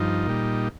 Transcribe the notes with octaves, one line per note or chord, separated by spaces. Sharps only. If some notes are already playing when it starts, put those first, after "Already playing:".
Already playing: G2 F3 D#4
A#2 G3